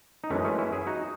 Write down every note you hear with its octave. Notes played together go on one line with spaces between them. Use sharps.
D#4
F#2 E3 G#3 A3 C#4
A3 C#4
C#4 E4
E4 G#4
D#4 F#4